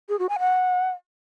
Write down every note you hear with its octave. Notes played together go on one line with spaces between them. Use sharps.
G#4
F#4
G#5
F#5